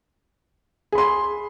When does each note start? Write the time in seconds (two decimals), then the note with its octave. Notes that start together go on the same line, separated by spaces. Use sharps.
0.92 G#4
0.95 B5
0.98 C6